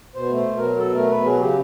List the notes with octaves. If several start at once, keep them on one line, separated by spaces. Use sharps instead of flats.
B2 C5
A3
C5
B2
A#4
F#3
B2 A4
A3 A#4
B2 B4
F#3 G#4
C#3 G4